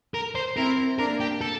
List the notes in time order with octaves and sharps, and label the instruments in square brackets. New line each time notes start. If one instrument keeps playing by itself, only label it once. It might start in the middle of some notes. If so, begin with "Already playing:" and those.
[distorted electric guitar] A#4
C5
[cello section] C4 E4 [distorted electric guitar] A#4
[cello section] A#3 D4 [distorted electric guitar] A#4
[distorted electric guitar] G4
A4